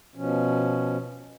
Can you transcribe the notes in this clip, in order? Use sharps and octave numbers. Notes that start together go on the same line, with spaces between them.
B2 F3 C#4